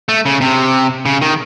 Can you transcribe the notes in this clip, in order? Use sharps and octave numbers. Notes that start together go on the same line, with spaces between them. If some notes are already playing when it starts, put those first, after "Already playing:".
A3
C#3
C3
C#3
D#3